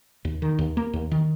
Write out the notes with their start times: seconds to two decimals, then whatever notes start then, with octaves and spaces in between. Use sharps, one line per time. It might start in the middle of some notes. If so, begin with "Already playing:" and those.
0.25 D#2
0.42 D#3
0.59 D#2
0.77 A#3
0.93 D#2
1.11 D#3